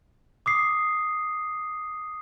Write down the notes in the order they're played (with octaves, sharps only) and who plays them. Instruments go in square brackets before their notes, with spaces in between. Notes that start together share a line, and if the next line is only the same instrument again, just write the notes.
[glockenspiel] D6 D#6 C7